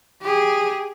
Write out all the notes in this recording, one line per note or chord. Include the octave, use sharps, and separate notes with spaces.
G4 G#4